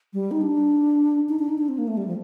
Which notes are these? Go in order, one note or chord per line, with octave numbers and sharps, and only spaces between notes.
G3
D#4
D4
D#4
D4
D#4
D4
C4
A#3
A3
G3
F3